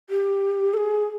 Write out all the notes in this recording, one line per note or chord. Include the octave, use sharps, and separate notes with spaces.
G4
A4
G#4